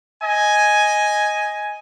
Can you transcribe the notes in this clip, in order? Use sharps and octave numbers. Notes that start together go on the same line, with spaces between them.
D#5 G#5